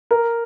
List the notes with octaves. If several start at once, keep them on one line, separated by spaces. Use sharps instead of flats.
A#4